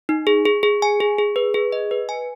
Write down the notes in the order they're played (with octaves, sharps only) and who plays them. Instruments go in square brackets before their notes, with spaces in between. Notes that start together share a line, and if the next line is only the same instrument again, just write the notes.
[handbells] D#4
G#4
G#4
G#4
G#5
G#4
G#4
B4
G#4
D#5
B4
G#5